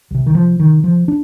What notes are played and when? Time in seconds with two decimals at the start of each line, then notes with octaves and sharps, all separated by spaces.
0.11 C2 C3
0.26 D#3
0.35 F3
0.59 D#3
0.84 F3
1.08 D4